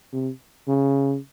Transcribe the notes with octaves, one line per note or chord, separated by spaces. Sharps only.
C3
C#3